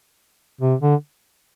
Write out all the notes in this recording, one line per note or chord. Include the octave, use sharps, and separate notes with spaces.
C3
D3